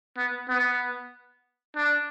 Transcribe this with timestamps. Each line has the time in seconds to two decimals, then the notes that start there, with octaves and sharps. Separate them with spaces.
0.18 B3
0.49 B3
1.76 D4